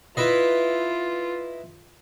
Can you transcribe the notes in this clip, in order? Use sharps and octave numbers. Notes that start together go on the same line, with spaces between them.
E4 F4 B4 D#5